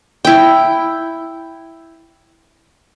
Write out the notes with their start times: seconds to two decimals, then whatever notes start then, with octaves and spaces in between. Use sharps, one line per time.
0.25 E4 G5